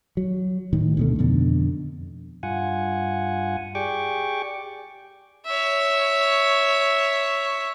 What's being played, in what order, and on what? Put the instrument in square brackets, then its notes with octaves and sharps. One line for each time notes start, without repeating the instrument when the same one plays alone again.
[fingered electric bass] F#3
A2 D#3
D2 B2 A3
F2 B2 D3
[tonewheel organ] G2 F4 F#5 G#5
G4 G#4 D5 G5 C#6 D6
[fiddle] C#5 E5